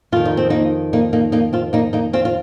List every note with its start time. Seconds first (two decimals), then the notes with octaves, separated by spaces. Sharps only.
0.12 F2 D#3 F4
0.25 D#4
0.37 C4
0.50 A#3 D#4
0.93 A#3 D#4
1.13 A#3 D#4
1.32 A#3 D#4
1.53 C4 F4
1.73 A#3 D#4
1.93 A#3 D#4
2.13 C4 F4
2.25 F4